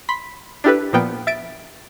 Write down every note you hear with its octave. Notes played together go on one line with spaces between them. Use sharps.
B5 C6 B6
D4 E4 G4 A4 B4
A#2 F3 A#3 B3 G5
E5 A6 D7